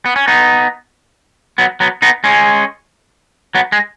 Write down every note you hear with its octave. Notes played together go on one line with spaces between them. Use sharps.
B3
C#4
B3 D#4
F#3 B3
F#3 B3
B3 D#4
G#3 C#4
F#3 B3
G#3